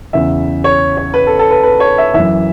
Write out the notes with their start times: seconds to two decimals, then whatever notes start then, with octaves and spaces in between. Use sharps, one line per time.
0.13 E2 C#3 E3 E5
0.64 C#5
0.97 C#5
1.14 B4
1.27 A4
1.39 A4
1.51 B4
1.63 B4
1.80 C#5
1.98 E5
2.14 F#2 E3 E5